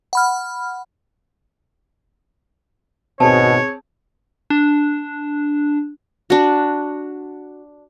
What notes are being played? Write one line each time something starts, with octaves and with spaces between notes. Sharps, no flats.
F#5 B5 F6
G#1 B2 C4 G#4 C#5 A5
D4
D4 F#4